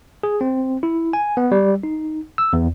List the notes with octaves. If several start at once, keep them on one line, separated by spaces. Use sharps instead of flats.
G#4
C4
E4
G#5
B3
G3
D#4
E6
E2